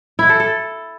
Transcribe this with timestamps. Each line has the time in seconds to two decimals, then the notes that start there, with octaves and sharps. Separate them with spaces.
0.19 E4
0.29 A4
0.40 A4